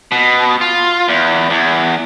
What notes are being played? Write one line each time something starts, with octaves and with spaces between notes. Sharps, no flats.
B2
F4
E2
E2